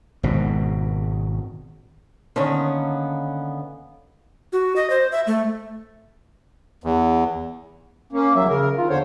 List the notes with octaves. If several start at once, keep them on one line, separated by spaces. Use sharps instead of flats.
G#1 B2
D3 D#3 A#3 B3 C#4
F#4
D#5
C5
E5
A3
E2
A#3 C#4
E2 F#3 E5
C#3 A#4
D#3 F4
E2 D3 C5 C#5